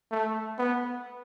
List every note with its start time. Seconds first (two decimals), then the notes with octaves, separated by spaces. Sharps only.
0.11 A3
0.59 B3